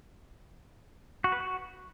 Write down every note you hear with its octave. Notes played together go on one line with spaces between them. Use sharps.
F#4
B4
F#4